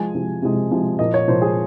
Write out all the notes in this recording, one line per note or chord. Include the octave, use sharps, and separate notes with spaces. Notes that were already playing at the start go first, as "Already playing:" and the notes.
Already playing: F3 G#3 G#5
C3 F3 G#3
C3 F3 G#3
C3 F3 G#3
A#2 F3 A#3 D#5
C#5
A#2 F3 A#3 C5
G#4